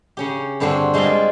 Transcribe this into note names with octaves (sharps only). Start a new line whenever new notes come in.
C#3 C#4 G4
G2 D3 C4 D4 F#4
G3 G#3 C4 F4 D5 D#5